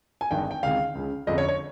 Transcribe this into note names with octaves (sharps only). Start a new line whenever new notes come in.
G#5
G#1 G2 D#3 G5
G5
C#2 C3 D#3 F5
C#2 C#3
G1 F2 C#3 D#5
C#5
C#5